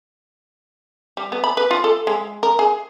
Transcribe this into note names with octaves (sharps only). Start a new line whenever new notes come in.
G3
B3
B5
B4
F4
A4
G#3
A#4
G#4